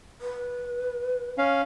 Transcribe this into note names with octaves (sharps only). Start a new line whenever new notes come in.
B4
C#4 F5